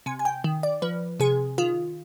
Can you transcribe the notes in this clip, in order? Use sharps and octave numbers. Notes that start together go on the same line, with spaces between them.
C3 G#5
G#5
G5
D#3
D5
F3 B4
C3 G#4
D#3 F4